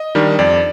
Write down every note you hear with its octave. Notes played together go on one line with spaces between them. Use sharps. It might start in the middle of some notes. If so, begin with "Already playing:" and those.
Already playing: D#5
D#3 G3 D4
F2 D5